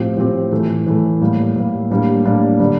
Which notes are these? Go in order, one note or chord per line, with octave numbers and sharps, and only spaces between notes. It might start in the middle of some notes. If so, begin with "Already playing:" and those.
Already playing: A2 F3 C4 G4
A2 F3 C4 G4
A2 E3 A3
A2 E3 A3
A2 G3 A#3
A2 G3 A#3
A2 G3 A#3 D4 G4
A2 G3 A#3 D4 G4
D3 G3 D4